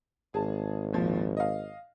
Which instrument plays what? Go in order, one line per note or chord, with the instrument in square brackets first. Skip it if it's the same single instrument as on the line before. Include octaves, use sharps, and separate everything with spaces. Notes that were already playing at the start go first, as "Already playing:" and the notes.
[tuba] G#1 [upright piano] G#4 A5
[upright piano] D#2 A#2 F3
D#5 F5